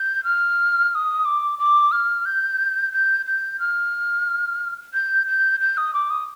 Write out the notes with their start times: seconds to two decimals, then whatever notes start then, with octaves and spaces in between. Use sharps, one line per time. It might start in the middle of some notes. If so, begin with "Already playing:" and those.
Already playing: G6
0.24 F6
0.91 F6
0.95 D#6
1.25 D6
1.59 D6
1.92 F6
2.25 G6
2.93 G6
3.26 G6
3.60 F6
4.94 G6
5.27 G6
5.60 G6
5.77 D#6
5.94 D6
6.10 D#6